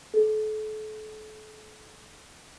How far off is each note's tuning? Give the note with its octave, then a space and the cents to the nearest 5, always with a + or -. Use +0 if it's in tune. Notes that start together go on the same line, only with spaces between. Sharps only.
A4 -35